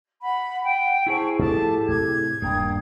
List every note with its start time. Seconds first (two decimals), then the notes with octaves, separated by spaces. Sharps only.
0.22 F#5 B5
0.64 G5
1.07 E4 G#4 C5 G#5 A5 C#6
1.39 A2 F3 G4 A4 A5
1.88 A2 C3 G#6
2.42 D#1 G2 A#3 G5 D#6